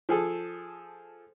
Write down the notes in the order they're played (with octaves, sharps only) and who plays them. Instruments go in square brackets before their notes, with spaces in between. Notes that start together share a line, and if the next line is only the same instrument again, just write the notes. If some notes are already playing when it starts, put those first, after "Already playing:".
[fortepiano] F3 G#4 A4